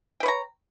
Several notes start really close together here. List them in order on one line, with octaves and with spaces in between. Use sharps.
G5 B4 C#5 A#5